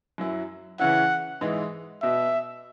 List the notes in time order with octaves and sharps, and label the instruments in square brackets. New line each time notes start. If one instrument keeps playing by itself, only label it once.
[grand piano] F#2 F#3 E4
[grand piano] C#3 E3 C#4 E4 [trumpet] F#5
[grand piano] G#2 E3 G#3 E4
[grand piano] B2 B3 F#4 [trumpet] E5